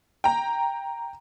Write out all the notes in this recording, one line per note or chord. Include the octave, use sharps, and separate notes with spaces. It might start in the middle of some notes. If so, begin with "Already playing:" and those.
G5 A#5